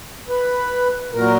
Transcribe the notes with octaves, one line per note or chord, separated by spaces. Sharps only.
B4
A#2 F#3 A#4